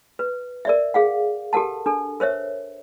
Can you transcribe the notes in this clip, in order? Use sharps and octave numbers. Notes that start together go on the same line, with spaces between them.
B4
A#4 D5 E5
G#4 F5 F#5
G4 A4 A#4 F#5 A5
D4 A4
A#4 C5 C#5 E5